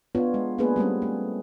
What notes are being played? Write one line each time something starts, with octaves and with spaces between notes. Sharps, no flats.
B3 D4 F4 C#5
G#3
A#3 B3 D4 G#4 B4
G3 A3 C4 C#4
A3